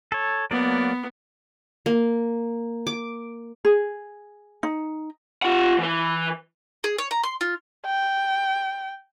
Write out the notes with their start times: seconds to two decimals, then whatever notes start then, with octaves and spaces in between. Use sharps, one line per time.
0.12 A4 C#5
0.51 F#3 A#3 B3 D5
1.86 A#3
2.87 D6
3.65 G#4
4.63 D#4
5.42 F4 F#5
5.78 E3 B4
6.84 G#4
6.98 C#5
7.11 A#5
7.24 C6
7.41 F4
7.86 G5